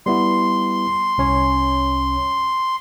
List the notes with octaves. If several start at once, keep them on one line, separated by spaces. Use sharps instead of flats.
G3 B3 E4 C6
C2 C#4 C#5